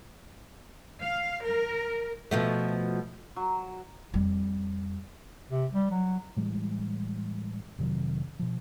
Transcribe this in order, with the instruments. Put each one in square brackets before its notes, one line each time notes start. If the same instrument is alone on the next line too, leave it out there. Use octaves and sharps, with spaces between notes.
[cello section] F5
A#4
[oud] B2 F3 A3
[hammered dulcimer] F#3
[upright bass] F2 G3
[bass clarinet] C3
G3
F#3
[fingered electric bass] A2 E3 G3 G#3
F1 C3 D#3 F#3
B2 F3